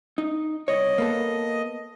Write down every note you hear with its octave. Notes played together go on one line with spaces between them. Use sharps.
D#4
C2 C#5 D#5
A#3 B3 A4